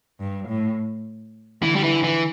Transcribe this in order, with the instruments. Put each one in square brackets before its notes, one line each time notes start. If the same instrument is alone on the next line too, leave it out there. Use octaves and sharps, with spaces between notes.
[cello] G2
A2
[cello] D3 [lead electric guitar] E3
[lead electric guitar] G3
E3
E3